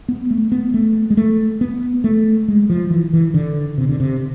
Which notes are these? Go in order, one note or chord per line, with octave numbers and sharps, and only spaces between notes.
B3
A3
B3
A3
G#3
A3
B3
A3
G#3
F3
E3
E3
D3
C3
D3
C3